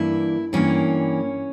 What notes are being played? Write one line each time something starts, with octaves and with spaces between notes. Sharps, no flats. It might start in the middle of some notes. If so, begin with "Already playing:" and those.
Already playing: G2 E3 A#3 E4
G2 E3 A#3 C#4